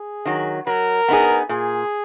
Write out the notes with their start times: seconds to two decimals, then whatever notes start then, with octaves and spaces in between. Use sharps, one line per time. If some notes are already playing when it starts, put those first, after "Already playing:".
Already playing: G#4
0.25 D#3 F#3
0.67 F#3 A#4
1.08 B3 D#4 G#4
1.49 A#2 G#4